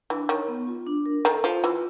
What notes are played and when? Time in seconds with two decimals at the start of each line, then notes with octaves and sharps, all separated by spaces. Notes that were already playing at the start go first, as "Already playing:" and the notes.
0.10 E3 D4
0.29 D#3 C#5
0.48 B3
0.67 F4
0.86 D4
1.06 A#4
1.25 D#3 A4
1.44 F3 F4
1.64 E3 F4